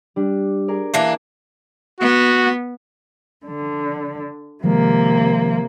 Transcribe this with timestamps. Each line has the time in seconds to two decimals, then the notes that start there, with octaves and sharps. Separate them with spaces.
0.16 G3 D4
0.68 G#4 A#4 D5
0.94 E3 A#3 D4
2.00 B3 F#4
3.46 D3
4.64 C3 D#3 F3 G#3 A#3